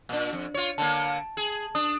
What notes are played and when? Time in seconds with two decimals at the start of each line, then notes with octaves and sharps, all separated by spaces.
0.09 A#2 D4
0.33 F2
0.54 F4 C#5
0.78 D3 A#3 A5
1.37 G#4
1.75 D4 D#6